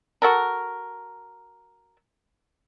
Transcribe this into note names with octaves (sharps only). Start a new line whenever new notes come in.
F#4 A4 A#4